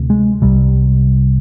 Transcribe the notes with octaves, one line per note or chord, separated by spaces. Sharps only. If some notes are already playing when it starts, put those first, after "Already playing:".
Already playing: D2 C3
G#3
C2 C3 G3